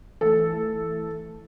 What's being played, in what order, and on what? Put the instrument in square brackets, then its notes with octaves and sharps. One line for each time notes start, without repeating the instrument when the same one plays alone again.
[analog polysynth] E3 A3 [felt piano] A4